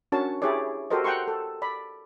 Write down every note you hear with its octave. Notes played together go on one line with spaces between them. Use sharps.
C#4 D4 F#4 A#4 C#5 A5
E4 G4 G#4 C#5 D5
F#4 G4 A4 A#4 C5 D#5
F#5 G5 A#5 C6 C#6
A4
D5 B5